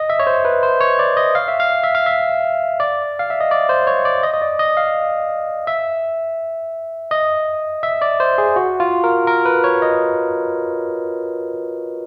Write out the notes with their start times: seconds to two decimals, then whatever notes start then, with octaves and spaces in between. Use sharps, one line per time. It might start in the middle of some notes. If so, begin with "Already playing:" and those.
Already playing: D#5
0.10 E5
0.19 C#5
0.27 C5
0.45 B4
0.63 C5
0.80 C#5
0.99 D5
1.17 D#5
1.35 F5
1.48 E5
1.60 F5
1.83 E5
1.95 F5
2.06 E5
2.80 D5
3.19 F5
3.30 E5
3.41 D#5
3.51 D5
3.69 C5
3.87 C#5
4.05 D5
4.23 D#5
4.34 D#5
4.42 D5
4.59 D#5
4.77 F5
5.67 E5
7.11 D#5
7.83 E5
8.02 D5
8.20 C5
8.38 G#4
8.56 F#4
8.80 F4
9.04 A#4
9.27 A#4
9.45 B4
9.64 C#5
9.82 D#5